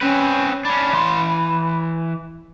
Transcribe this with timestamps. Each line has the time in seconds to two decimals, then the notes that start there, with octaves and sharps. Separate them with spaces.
0.01 C4 C#4 B4
0.65 C#4 D4 B5
0.93 E3 C6